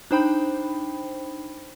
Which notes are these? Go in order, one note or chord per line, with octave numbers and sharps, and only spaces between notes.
D4 D#4 C5 G5 B5